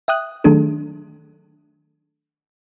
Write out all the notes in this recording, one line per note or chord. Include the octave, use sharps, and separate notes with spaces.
E5 G5 D#6 F#6
D#3 F#3 A3 D4 G#4 A4